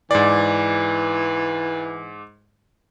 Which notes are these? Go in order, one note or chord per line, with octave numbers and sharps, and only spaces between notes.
G#2 E3 D5